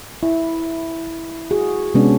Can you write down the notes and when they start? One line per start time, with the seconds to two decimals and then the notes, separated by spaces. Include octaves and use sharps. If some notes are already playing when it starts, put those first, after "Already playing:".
0.23 E4
1.51 F#4 G#4
1.94 C3 G#3 B3 C#4 D4